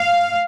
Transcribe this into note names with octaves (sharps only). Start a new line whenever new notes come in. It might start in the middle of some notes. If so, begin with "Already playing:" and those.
Already playing: F5